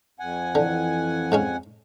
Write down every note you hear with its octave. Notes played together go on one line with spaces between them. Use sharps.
F2 F#5 G#5
D3 E3
G#2 G#3 C#4